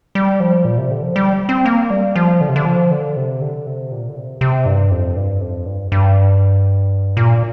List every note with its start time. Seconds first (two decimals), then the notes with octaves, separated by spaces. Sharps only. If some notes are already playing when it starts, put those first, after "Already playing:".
0.15 G3
0.40 F3
0.65 A#2
0.78 C3
0.91 D3
1.03 F3
1.16 G3
1.49 C4
1.66 A#3
1.90 G3
2.16 F3
2.41 D3
2.49 C3
2.56 D3
2.65 F3
2.91 D3
3.17 C3
3.42 D3
3.66 C3
3.91 A#2
4.09 D3
4.16 C3
4.41 C3
4.66 G2
4.91 F2
5.16 G2
5.41 F2
5.66 G2
5.92 G2
7.17 A#2